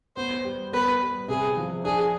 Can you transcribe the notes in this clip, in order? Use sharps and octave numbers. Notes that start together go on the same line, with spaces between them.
B3 C5
G3
B3 B4
G3
C3 G#4
F3
D4 G#4